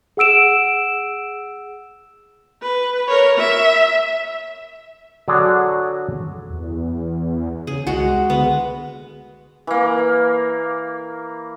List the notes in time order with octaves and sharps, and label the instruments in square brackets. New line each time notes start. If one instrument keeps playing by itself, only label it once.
[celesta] G#4 F#5 E6 D7 E7
[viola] B4
A#4 C#5
E5
[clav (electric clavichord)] D3 F#3 D4 F#4 G#4
[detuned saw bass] E2
[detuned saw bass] C#3 [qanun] G#4
[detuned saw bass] C2 [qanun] G#3 F#4
[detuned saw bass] D3 [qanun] B3
[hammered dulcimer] E3 A#3